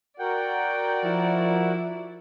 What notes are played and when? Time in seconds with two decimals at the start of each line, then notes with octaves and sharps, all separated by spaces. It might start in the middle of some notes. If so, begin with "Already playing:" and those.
0.20 F#4 A#4 D5 F#5 G5
1.04 F3 E4